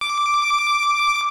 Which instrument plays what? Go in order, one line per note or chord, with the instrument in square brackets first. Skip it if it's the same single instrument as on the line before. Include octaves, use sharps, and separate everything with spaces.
[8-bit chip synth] D6